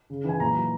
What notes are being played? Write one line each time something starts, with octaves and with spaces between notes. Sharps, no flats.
C#3
E3 G#5
A#2 A#5
F#3